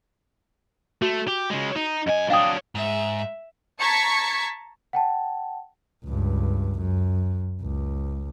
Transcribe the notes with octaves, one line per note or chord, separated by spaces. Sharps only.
A3 F#4
G4
C#3 G#3
D#4
F#2 D#5 G#5
F#3 D4 F5 G5 D#6
G#2 E5
A5 A#5 C#6 G#6 B6 C#7
F#5 G5 A5
C#2 G2
F#2
C#2